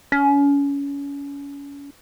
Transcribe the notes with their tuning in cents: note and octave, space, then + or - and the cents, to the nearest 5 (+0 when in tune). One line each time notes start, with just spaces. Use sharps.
C#4 +30